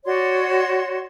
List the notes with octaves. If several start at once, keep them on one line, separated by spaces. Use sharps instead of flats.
F#4 C#5 D5 C6